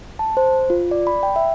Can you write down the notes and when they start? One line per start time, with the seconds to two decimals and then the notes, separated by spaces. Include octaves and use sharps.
0.19 A5
0.37 C5
0.70 F4
0.91 D5
1.07 B5
1.23 G5
1.36 E5